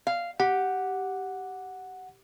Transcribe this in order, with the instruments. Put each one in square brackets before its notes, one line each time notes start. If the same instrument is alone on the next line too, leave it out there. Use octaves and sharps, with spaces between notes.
[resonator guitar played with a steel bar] F5
[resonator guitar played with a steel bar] G4 [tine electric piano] F#5